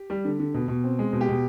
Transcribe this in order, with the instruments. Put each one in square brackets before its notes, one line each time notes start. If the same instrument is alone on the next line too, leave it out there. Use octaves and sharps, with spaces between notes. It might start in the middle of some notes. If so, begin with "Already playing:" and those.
Already playing: [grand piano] G4
G3
D3
D3
B2
B2
C4
G#3
B2
G4
B2